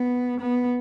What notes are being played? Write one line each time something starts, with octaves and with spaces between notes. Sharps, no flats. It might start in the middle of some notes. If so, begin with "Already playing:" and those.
Already playing: B3
B3